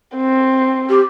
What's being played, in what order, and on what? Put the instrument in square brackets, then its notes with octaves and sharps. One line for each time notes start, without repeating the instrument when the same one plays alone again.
[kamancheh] C4
[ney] G4